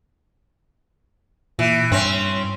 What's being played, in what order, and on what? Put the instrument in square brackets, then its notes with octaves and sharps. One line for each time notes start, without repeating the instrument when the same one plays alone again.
[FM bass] A#2 [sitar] E3
[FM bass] G2 [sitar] C4 C#4